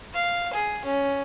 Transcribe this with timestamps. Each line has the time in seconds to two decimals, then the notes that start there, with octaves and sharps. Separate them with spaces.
0.15 F5
0.54 G#4
0.86 C#4